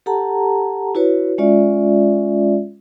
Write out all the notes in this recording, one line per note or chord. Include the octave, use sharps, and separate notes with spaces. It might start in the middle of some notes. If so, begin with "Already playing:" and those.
G4 A4 F#5 A5 A#5
E4 F#4 B4 C#5
G#3 C#4 F4 D5 E5